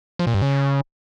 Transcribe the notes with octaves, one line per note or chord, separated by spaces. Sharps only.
F3
A#2
G2
C#3